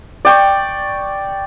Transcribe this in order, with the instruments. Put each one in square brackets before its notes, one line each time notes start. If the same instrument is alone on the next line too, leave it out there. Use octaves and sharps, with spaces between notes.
[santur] D5 G5 C#6